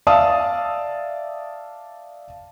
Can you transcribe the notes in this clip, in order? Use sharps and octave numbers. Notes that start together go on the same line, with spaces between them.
D5 E5 F5 A5 D#6